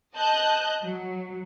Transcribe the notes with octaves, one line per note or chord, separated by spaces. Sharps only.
D#5 A5 F#6 G6
F#3